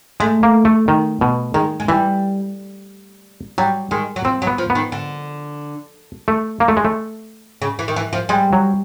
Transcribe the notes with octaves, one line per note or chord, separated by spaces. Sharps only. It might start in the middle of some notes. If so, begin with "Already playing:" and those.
G#3 A3
A#3
A3
D#3
B2
D#3 G#3
G#3
E3 G3
F#3 G3
D#3 G#3
F#3
F3 C4
F#3
B3
F3
B3
D#3
D3
A3
A#3
A3
G#3
A3
C#3
E3
D#3
E3
F3
G3 G#3
F#3